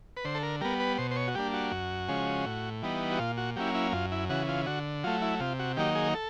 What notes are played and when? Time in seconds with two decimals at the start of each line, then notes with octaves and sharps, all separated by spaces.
0.17 B4
0.25 D3 C5
0.35 A4
0.43 A#4
0.61 G3 B3 A#4
0.80 B4
0.98 B2 C5
1.11 C5
1.16 C#5
1.28 F#4
1.35 G3 A#3 D4 G4
1.54 F#4
1.72 F#2
2.08 C#3 F3 G#3 C#4
2.46 A2
2.82 E3 G3 B3 D#4
3.12 F#4
3.19 A#2 F4
3.37 F#4
3.56 F#3 A#3 C#4 E4 G4
3.75 E4
3.92 F#2 F4
4.12 E4
4.29 C#3 E3 F#4
4.49 F4
4.66 D3 F#4
5.04 F#3 A3 F4
5.22 E4
5.40 C3 F4
5.59 F#4
5.77 D#3 F#3 A#3 D#4 G4
5.95 G#4
6.14 A4